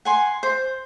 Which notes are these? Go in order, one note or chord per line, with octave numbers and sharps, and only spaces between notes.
F#5 G#5 C6
C5